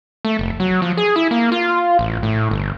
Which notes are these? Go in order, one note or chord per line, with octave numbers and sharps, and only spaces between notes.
A3
F1
F#3
F3
G#4
E4
A#3
F4
A1
A2
G1